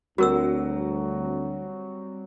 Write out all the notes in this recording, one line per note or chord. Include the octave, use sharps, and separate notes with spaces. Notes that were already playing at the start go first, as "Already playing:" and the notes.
D2 F#3 G3 C4 F#4 A#4 E6